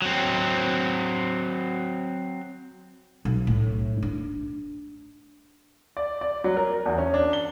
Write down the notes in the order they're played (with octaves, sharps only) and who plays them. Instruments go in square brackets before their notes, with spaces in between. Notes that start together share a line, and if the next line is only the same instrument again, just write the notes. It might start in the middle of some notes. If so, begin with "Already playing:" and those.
[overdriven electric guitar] F#3 C4
[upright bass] B1
A2
D4
[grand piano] D5
D5
F#3
A#4
E2
C#4
D4
G7